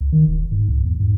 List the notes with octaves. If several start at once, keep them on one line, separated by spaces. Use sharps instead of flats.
C#2
D#3
D#1
G#2
C#2
E2
G#2